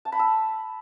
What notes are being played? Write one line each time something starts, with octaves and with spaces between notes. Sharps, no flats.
A5
B5
E6